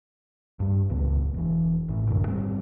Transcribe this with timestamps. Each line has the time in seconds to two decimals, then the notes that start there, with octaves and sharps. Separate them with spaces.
0.60 G2 G3
0.90 D#1 C#2 B3
1.34 E1 E3
1.89 G#1 A2
2.08 D1 F#2 D3
2.27 G#2 G3 C4